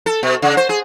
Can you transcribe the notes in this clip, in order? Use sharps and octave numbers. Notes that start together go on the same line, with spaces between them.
A4
B2
C#3
C5
G#4